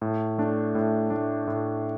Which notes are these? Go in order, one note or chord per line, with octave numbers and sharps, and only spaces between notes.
A2
A3 D4
A2
A3 D4
A2